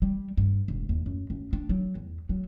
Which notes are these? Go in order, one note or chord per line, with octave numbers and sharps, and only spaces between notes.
G3
G2
E1
D#2
F#2
F#2
D4
F#3
E2
F#3